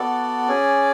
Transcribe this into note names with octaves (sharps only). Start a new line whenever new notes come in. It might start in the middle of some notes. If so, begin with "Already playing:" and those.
Already playing: B3 F#4 A4 D5
C#4 G#4